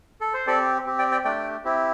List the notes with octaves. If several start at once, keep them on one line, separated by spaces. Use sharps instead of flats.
A4
C5
C4 G4 A4 D5
C4 G4
D5 G5
D5 G5
A3 D4 G4 D5 G5
C4 E4 G4